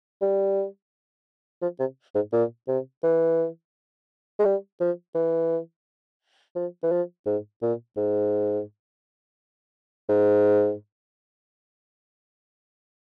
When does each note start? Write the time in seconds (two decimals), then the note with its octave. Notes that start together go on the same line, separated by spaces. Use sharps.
0.22 G3
1.62 F3
1.79 C3
2.15 G#2
2.33 A#2
2.68 C3
3.03 E3
4.40 G#3
4.45 G3
4.80 F3
5.15 E3
6.55 F3
6.83 E3
6.91 F3
7.27 G#2
7.62 A#2
7.97 G#2
10.09 G#2